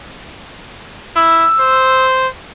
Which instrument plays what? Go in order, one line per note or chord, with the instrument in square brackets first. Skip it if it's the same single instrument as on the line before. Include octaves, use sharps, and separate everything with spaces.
[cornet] E4 [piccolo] E6
[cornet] C5